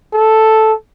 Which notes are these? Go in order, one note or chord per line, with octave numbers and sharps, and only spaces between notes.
A4